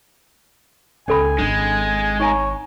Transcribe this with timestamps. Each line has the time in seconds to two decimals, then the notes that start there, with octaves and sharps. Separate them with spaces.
1.08 C#2 C#4 A4 G#5 B5
1.39 G#1 D#3 G#3 D4
2.20 D#4 C#5 G#5 A#5